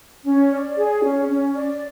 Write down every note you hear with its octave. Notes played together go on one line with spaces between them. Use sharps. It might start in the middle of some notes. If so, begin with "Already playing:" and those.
C#4
D5
G#4
C#4
C#4
D5